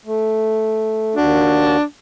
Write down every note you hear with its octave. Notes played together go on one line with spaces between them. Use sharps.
A3
D#2 D4 F#4